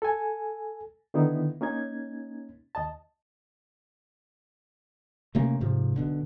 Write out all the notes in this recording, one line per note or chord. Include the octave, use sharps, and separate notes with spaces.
A4 G#5
D3 D#3 B3 D#4 E4
A#3 C#4 D#4 G#6
D#2 D#5 A5
C3 A3 A#3 C#4
G#2 C3 F3
B1 B2 D3